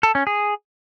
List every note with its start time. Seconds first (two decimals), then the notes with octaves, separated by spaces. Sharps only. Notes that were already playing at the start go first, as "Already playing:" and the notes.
0.03 A4
0.15 C#4
0.27 G#4